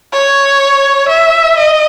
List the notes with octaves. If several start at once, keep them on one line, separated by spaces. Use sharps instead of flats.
C#5
E5
D#5